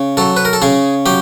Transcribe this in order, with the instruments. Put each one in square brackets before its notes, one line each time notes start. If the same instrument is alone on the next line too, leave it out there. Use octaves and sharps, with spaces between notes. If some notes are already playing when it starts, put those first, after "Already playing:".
Already playing: [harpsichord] C#3
F#3 A4
B4
A#4
A4
C#3 G#4
F#3 G4